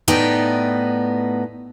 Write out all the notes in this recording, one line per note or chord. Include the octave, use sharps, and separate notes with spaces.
A2 B3 D#4 D5 G5